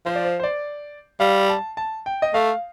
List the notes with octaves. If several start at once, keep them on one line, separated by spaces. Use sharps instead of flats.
F3 C5
D5
C5
C5
D5
G3 F5
A5
A5
G5
D#5
A3 F5